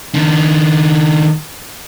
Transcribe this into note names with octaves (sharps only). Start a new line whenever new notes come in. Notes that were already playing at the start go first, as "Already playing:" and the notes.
D#3 D4